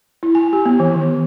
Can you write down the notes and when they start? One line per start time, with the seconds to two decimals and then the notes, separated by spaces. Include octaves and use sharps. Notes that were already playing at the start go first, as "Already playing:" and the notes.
0.23 E4
0.35 G#5
0.53 G4
0.66 B3
0.80 E3
0.94 D#3